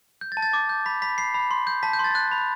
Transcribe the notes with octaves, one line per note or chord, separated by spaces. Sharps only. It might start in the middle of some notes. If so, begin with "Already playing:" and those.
G6
A6
A5
A6
D6
G6
B5 B6
B5 B6
B5 C7
B5
C6
G6
A5 B6
G6
C6
A6
F#6
B5